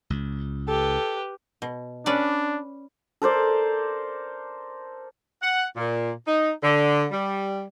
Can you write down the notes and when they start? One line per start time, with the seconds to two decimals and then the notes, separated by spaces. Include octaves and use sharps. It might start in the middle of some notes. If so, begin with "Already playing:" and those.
0.10 C#2
0.68 G4 A4 B4
1.62 B2
2.06 C#4 D4 B4 D5
3.22 A4 A#4 C5 D5
5.42 F#5
5.76 A#2
6.26 D#4
6.63 D3
7.11 G3